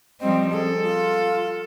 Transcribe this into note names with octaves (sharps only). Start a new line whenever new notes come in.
F3 G3 C4 D#5
G#4 A4
F4